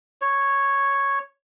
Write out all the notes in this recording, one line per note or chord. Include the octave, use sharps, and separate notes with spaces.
C#5